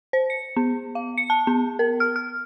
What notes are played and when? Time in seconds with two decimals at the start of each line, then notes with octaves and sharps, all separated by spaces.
0.13 C5
0.30 C#7
0.56 B3
0.95 F5
1.17 C#7
1.30 A5
1.47 B3
1.79 A#4
2.00 F6
2.16 F6